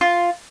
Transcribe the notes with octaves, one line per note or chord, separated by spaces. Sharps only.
F4